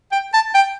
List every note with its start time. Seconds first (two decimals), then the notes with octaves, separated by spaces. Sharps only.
0.12 G5
0.34 A5
0.55 G5